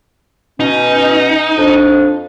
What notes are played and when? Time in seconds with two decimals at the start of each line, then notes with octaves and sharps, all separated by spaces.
0.60 B2 C#4 D#4
1.57 F2 D4